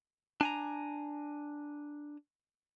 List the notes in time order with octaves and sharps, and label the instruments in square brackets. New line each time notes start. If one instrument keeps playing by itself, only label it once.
[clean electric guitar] D4 G#5 A#5